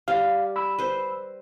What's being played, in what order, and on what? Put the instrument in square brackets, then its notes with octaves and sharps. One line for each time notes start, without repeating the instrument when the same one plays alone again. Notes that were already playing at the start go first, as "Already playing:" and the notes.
[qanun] G3 [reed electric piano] F5
[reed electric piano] B5 E6
[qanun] B4 C5